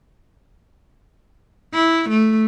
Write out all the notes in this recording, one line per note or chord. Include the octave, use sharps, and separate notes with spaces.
E4
A3